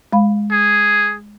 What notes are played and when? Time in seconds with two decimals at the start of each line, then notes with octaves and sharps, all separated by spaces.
0.13 G#3 F5 B5
0.51 G#4